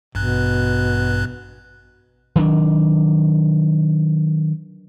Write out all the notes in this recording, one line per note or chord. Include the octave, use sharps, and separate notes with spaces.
A1 G2 B2 F#6
D#3 F#3 D4